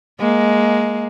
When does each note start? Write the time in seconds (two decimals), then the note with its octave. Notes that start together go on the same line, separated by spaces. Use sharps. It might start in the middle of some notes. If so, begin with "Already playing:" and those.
0.20 G#3 A#3